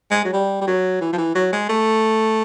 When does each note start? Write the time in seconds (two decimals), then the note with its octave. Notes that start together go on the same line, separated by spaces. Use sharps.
0.11 G#3
0.25 F#3
0.33 G3
0.61 G3
0.67 F#3
1.01 E3
1.13 F3
1.18 E3
1.35 F#3
1.53 G#3
1.69 A3